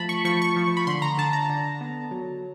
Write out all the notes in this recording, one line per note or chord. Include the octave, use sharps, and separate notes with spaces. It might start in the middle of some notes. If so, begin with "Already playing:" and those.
Already playing: F3 A3 A5 B5
C#6
F3 C#6
C#6
F3
B5
D3 C6
A#5
D3 A5
A#5
D3
B3
F#3